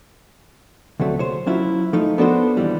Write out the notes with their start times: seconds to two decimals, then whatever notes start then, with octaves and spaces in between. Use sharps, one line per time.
1.00 D2 C3 F#3 A3
1.19 C5 C#5
1.47 F#3 C#4 E4 F4
1.93 F3 A3 D#4
2.18 B3 D4 F#4 A4 A#4 C5
2.57 D#2 E3 G3